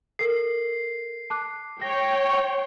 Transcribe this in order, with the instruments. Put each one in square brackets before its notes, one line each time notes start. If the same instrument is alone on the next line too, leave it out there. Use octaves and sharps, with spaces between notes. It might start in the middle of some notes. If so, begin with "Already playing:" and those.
[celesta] A4 A#4 [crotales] C7
[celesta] A5 D6 F#6
[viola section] C#5 G5 [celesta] A#6